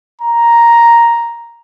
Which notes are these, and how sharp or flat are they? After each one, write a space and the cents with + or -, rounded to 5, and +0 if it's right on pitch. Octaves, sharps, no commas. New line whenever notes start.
A#5 +5